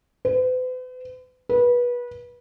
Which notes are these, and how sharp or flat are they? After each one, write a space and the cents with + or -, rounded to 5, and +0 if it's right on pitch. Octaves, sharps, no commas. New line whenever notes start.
B4 +45
B4 -25